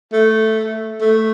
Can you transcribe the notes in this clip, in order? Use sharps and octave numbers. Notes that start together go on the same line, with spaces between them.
A3
A3